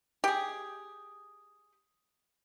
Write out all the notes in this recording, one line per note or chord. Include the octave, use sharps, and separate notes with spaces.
G4 G#4